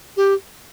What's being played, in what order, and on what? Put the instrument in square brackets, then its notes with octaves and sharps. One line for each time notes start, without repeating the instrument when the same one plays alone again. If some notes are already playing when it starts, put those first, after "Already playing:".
[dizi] G4